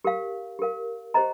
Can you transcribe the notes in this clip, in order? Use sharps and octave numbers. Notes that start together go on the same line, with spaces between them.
G4 A#4 F5
G4 A#4 F5
G4 C5 D#5 A#5